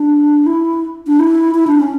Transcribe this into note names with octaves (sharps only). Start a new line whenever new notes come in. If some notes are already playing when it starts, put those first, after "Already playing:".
Already playing: D4
E4
D4
E4
E4
D4
C#4